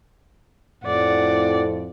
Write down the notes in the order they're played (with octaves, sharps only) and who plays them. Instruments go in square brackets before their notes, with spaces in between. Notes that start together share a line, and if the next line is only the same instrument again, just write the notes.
[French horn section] F2 A2 [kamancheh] D5 F#5